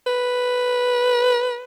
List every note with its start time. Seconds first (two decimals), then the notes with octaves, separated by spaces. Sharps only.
0.07 B4